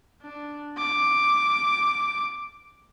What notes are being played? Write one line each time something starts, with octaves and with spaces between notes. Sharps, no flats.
D4
D6